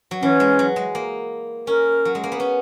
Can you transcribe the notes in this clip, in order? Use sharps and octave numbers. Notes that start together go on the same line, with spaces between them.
F#3
E3 C#4
G#3
F#3
G#3
A#3
C#4 A#4
F#3
G#3
A#3
B3
C#4